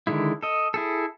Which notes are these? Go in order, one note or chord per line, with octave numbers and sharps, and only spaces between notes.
D3 D#3 G#3 E4
A4 D#5
E4 G#4 A4